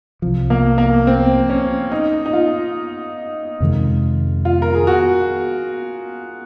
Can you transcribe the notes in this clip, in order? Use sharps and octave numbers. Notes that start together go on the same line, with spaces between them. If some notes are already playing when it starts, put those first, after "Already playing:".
C2 C3 F3
A#3
A#3
C4
C#4
D#4
D#4
F4
F2 C3 D#3 G#3
F4
A#4
G#4
F#4